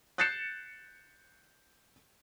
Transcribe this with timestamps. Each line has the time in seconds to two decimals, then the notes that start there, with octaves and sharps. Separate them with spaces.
0.18 F#6 G6 A6 C7 C#7 E7